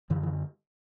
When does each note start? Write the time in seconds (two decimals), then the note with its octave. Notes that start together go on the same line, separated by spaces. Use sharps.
0.10 F#2 D3 E3
0.23 E3